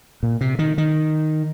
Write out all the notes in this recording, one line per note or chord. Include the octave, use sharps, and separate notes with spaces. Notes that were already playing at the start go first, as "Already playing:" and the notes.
A#2
C3
D#3
D#3